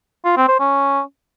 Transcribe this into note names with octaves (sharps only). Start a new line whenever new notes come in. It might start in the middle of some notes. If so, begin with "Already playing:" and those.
F4
C4
C5
C#4